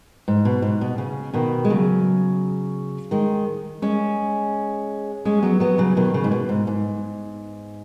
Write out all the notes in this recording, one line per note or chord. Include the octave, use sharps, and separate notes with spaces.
G#2
B2
G#2
B2
C#3
B2 D#3
G#3
C#3 F#3
D#3 G#3
G#3 C#4
G#3 C#4
F#3 B3
F#3 B3
C#3 F#3
B2 D#3
C#3
G#2
B2
G#2
G#2